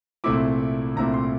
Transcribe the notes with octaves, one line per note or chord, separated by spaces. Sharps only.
C2 A#2 A3 C4 E4 D6
C2 A#2 A3 C4 E4 A#5
C6